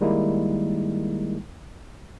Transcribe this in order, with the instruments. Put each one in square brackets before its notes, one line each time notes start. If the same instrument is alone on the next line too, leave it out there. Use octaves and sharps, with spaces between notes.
[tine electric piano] D#3 G3 G#3 A#3 D#4 E4